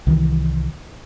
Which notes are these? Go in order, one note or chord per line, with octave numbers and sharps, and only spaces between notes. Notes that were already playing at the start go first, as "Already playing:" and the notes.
C2 D#3 E3